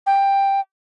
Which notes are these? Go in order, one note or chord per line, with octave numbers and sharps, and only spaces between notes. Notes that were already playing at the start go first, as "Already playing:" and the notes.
G5